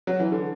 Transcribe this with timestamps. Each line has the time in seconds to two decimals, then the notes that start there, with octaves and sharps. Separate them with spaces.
0.07 F#3
0.20 E3
0.32 D3